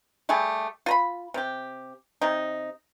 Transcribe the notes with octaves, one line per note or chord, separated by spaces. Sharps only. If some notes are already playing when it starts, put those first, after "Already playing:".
G3 A3 G4 G#4
F4 A#5 B5
C3 G4
C3 D#4